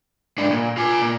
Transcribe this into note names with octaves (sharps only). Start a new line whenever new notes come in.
G#2 D4
A#2
F4 G#5
A#2